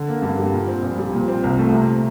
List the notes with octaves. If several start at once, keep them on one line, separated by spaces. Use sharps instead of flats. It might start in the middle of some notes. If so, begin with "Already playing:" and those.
Already playing: D3
A#3
G2
G3
A#2
C4
A#1
G3
A#2
C4
C2
A3
C3